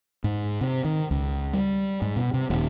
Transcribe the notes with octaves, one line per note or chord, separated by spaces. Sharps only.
G#2
C3
D#3
C#2
G3
G#2
B2
C3
D#1